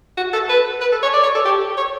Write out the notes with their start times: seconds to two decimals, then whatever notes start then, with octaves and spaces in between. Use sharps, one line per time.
0.17 F#4
0.33 A4
0.49 B4
0.81 B4
0.92 A4
1.02 C#5
1.13 D5
1.23 C#5
1.35 A4
1.45 G4
1.77 C#5